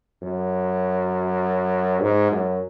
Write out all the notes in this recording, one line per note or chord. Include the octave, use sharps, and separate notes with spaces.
F#2
G#2
F#2